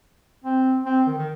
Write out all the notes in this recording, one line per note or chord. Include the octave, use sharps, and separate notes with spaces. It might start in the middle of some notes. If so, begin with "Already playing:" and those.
C4
C4
D#3
D#3